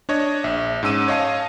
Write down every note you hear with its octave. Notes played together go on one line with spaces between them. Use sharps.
D4 C#5 D#5
A#1 E5
G#2 C#4 E6 D#7
C#5 D#5 F5 A5